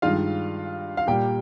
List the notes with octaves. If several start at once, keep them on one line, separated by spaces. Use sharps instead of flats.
G2 D#3 G#3 F4 F5
F5
A#2 G3 A#3 G4 G5